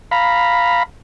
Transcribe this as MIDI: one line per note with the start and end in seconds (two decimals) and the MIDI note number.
0.11 0.83 77
0.11 0.83 82
0.11 0.83 83